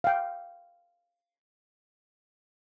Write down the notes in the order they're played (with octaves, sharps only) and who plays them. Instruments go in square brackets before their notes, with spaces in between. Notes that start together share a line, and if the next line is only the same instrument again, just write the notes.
[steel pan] F5 G5